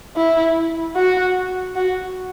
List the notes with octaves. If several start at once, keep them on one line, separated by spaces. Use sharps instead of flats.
E4
F#4
F#4